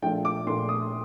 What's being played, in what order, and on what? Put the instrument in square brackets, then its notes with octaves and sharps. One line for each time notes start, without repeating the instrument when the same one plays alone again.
[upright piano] A#1 A#2 A3 D4 F4 G5
D6
A#1 A#2 A3 D4 F4 C6
D#6